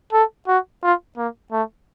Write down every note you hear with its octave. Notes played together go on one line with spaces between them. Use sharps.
A4
F#4
F4
A#3
A3